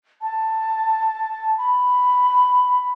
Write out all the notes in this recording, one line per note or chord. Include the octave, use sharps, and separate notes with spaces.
A5
B5